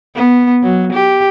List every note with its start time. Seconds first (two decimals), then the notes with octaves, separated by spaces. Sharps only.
0.16 B3
0.63 F#3
0.93 G4